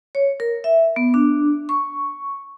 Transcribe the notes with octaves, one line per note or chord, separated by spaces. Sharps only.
C#5
A#4
E5
B3
D4
C#6